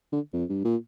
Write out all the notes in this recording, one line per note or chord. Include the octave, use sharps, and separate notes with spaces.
D3
F2
G2
A#2